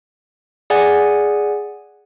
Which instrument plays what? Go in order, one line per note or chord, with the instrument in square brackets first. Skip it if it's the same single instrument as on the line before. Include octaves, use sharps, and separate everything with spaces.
[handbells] G#4 D5 F#5 G#5